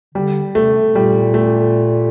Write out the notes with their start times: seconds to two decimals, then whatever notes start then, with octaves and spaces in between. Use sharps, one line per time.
0.15 D3 G3
0.55 C3 A3
0.95 A#2 G3
1.34 A3